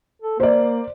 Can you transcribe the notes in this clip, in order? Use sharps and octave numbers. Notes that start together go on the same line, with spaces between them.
A4
A#3 C5 D5